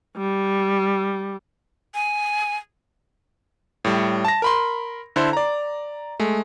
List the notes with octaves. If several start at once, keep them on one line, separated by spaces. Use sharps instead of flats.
G3
G#5
A2 G3
A5 A#6
A#4 B5 C6
D3 E4 A4 C5
D5 A#5
G#3 A3